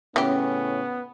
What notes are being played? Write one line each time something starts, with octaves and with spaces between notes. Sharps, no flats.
A2 C#3 E3 B3 C#4 G4